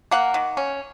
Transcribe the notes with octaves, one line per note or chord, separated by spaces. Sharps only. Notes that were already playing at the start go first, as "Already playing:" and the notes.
A#3 F#5
D#3
C#4